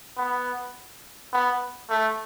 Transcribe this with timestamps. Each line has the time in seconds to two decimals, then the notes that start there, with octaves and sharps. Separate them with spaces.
0.18 B3
1.33 B3
1.90 A3